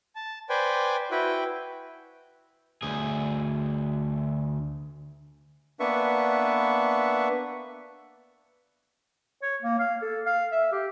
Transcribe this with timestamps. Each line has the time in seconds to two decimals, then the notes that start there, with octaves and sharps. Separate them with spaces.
0.15 A5
0.49 B4 C5 D5 G5 G#5
1.11 E4 F#4 B4 G5
2.82 D2 G#4
5.80 A#3 B3 D4 B4 E5 C#6
9.42 C#5
9.62 A#3
9.79 F5
10.02 A4
10.26 F5
10.52 E5
10.72 G4